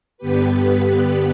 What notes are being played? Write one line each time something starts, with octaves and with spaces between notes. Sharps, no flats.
G2 D3 B3 G4 B4